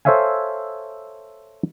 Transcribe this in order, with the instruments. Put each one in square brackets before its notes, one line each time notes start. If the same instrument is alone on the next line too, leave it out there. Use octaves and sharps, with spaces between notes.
[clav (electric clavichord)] A4 C5 C#5 E5 F5 G#5